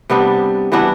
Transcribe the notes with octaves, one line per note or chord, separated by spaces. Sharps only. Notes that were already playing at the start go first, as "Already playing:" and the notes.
C3 G3 B3 D4
E3 G3 B3 D4 F#4